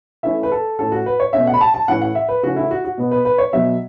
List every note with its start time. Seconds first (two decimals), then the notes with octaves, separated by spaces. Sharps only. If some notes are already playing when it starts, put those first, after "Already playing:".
0.23 E3 A3 C#4 E5
0.43 B4
0.52 A4
0.79 A2 E3 C#4 A4
0.92 F#4
1.06 B4
1.20 C#5
1.33 B2 A3 C#4 E5
1.47 F#5
1.54 B5
1.61 A5
1.74 A5
1.88 A2 E3 A3 C#4 F#5
2.01 F#5
2.15 E5
2.29 B4
2.43 C#3 E3 A3 C#4 F#4
2.56 E4
2.71 F#4
2.85 F#4
2.98 B2 B3
3.11 B4
3.25 B4
3.38 C#5
3.53 B2 F#3 B3 E5